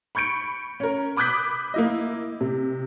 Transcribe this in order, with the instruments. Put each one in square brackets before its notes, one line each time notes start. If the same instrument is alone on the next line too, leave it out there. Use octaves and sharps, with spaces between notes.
[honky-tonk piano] B5 C#6 G6 C#7 D7
C#4 A#4
B5 D6 D#6 F#6 G6 B6
A#3 E4 D#5
C3